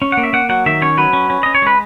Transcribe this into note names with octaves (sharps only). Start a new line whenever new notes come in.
C#4
F#5
A#3
E5
A#3 F#5
F#3 F#5
D#3 E5
C#4 C#5
F#3 B4
C#4
C#4
C#4 D#5
C#5
G#3 B4